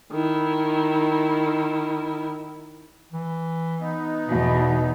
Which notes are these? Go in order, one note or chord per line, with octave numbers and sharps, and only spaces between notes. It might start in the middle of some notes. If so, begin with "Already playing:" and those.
D#3 E4
E3
B3 D#4
E2 B2